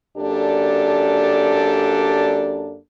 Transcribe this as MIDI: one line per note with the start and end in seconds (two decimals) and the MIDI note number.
0.17 2.77 42
0.17 2.77 58
0.17 2.77 62
0.17 2.77 67
0.17 2.77 69
0.17 2.77 74